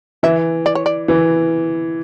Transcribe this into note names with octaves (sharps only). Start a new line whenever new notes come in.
E3 E5
D5
C#5
D5
E3